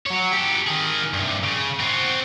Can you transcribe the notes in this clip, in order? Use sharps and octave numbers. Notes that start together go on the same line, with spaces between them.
F#3 C#5
G4 A4
D#3 G#4
G2 C3
C#3
C4 F#4